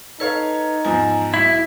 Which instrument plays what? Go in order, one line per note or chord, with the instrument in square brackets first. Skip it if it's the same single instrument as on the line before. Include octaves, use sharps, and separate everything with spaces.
[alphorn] D#4 [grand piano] A4 C#5 F5 [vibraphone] B4
[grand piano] E2 G#2 F3 [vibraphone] G#5
[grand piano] B1 [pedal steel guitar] E4 [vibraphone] B5